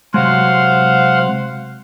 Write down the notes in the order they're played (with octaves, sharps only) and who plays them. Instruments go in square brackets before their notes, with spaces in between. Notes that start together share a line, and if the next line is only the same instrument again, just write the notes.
[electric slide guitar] C3 F#3 G#3 [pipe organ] C5 F5 F#5